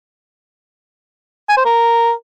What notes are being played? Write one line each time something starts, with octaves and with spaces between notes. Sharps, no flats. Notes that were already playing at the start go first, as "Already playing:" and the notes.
G#5
C5
A#4